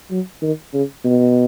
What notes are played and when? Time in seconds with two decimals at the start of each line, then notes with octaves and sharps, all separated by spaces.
0.11 F#3
0.42 D#3
0.73 C#3
1.04 B2